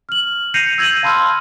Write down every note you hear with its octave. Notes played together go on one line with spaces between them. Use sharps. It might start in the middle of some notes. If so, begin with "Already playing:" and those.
F6 F#7
G6 A#6 C7 C#7 D#7 F7
E6 G6 G#6 A#6 D#7 F#7
F5 A5 B5 C6 E6 F6